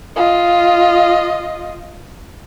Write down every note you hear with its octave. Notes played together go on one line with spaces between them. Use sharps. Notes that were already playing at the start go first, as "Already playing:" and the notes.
F4 D#5